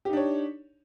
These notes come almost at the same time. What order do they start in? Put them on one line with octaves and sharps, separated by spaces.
G4 D#4 D4 C#5